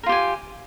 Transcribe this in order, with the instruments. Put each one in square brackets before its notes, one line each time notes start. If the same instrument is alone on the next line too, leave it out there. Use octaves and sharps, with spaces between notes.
[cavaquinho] A#4
F4
G4
G#5